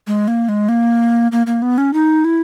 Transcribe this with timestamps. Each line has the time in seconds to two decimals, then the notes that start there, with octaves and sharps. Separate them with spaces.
0.07 G#3
0.28 A#3
0.49 G#3
0.69 A#3
1.32 A#3
1.47 A#3
1.62 B3
1.78 C#4
1.94 D#4
2.25 E4